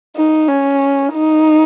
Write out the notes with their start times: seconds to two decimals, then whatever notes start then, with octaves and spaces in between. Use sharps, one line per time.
0.16 D#4
0.48 C#4
1.13 D#4